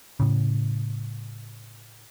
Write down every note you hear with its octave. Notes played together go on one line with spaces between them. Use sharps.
A2 C#3